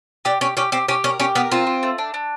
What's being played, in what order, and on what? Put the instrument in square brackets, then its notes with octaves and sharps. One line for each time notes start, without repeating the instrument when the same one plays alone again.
[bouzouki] D4 [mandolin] G4
[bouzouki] C#4 [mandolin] G4
[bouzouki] C#4 [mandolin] G4
[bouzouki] C4 [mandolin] G4
[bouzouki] C#4 [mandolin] G4
[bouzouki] C#4 [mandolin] A#4
[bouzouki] C#4 [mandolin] G4
[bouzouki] B3 [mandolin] A#4
[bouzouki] C4 [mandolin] F4
[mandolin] F4
A3
D4
D4